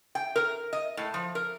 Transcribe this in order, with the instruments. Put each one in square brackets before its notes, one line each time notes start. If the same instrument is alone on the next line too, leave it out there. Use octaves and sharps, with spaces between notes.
[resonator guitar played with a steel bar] G5
A#4
D#5
A2
F3
A#4